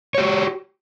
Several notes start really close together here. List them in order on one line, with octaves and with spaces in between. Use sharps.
C#5 G4 F#4